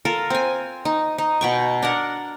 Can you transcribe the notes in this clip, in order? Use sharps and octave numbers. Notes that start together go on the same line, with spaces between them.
F4 A4 A#4
C4 G#5
D#4
D#4
B2 G5 C#6
D4 A#4 F#5